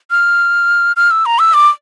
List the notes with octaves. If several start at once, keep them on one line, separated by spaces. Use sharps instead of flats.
F6
F6
E6
A#5
E6
D6